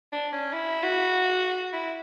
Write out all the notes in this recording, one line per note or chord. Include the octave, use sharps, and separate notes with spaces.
D4
C#4
E4
F#4
E4